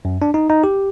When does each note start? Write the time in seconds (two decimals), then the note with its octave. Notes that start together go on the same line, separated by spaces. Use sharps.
0.05 F#2
0.22 D4
0.34 D#4
0.49 D#4
0.64 G4